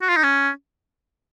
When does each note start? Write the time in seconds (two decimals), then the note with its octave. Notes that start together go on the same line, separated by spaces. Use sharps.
0.02 F#4
0.09 F4
0.16 D#4
0.24 C#4